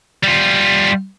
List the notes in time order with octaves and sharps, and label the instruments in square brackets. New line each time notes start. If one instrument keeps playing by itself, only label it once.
[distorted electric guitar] G3 F4